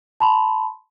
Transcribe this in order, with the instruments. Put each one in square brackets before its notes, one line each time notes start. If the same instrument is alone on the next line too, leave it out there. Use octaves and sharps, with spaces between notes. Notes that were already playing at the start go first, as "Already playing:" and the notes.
[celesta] A5 B5 C6